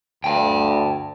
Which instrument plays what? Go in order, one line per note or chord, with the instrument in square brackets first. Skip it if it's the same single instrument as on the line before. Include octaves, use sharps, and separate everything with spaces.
[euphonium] D2 [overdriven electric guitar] G5 A5